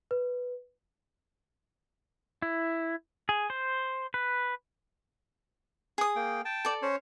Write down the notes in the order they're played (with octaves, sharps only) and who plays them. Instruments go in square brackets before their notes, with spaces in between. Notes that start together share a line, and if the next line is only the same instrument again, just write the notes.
[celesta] B4
[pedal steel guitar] E4
G#4
C5
B4
[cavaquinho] G#4 D#6
[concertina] A#3 G5
G5 A5
[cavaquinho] A4 D5
[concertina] C#4 C5 C#5